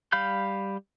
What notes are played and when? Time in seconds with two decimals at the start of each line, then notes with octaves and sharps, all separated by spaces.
0.12 G3 F5 B5 F6 G6